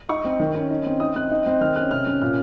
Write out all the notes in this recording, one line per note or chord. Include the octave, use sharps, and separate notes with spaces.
D#4 C#6
C4
D#3
C#4
D#4
C4
D#4 D#6
C4 F#6
D#4
C4
D#3 F6
C#4 F#6
C3 F6
C#4
A#2 F6